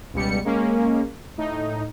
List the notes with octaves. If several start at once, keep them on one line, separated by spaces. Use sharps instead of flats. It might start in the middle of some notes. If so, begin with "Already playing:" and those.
C#2 B2 G3 C#7
G#3 A#3 C#4
A2 D#4